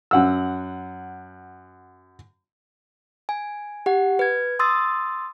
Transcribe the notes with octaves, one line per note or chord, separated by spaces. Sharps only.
F#2 F#5 E6
G#5
G4 F#5
B4 G#6
C6 D#6 E6 A6